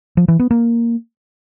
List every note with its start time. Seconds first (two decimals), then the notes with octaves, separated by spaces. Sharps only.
0.17 F3
0.28 E3
0.39 B3
0.51 A#3